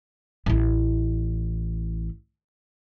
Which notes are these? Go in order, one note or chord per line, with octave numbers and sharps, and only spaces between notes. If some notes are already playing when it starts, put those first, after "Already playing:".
A1 E4